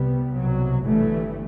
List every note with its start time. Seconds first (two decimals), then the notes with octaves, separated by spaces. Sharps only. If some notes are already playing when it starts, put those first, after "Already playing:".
Already playing: C2 C3 G3 B3
0.33 C2 B2 F#3
0.85 G1 G2 E3 A3